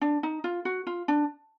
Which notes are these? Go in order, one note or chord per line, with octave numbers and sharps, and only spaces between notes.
D4
D#4
F4
F#4
F4
D4